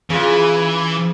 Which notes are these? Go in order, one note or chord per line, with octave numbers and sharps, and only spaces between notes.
C#3 E3 F4